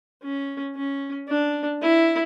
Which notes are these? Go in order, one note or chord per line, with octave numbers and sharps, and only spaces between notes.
C#4
C#4
D4
E4